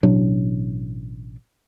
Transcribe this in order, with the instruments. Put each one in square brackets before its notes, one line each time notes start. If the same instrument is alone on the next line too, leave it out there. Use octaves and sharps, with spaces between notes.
[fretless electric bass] A1 B2 F#3 D4